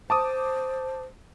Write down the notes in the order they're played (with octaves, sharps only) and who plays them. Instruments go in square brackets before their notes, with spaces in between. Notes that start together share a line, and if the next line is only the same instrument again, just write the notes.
[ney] C5 [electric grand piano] A5 D6 D#6